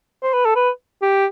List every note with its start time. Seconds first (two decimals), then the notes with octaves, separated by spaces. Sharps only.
0.23 C5
0.33 B4
0.45 A4
0.56 B4
1.02 G4